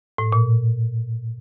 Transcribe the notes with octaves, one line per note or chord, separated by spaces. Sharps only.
A2
A#2